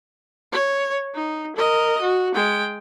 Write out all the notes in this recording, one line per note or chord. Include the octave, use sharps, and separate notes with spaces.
C#5
D#4
A#4 D#5
F#4
G#3 G5